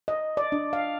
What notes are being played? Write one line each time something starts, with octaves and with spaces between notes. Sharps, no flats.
D#5
D5
D4
F5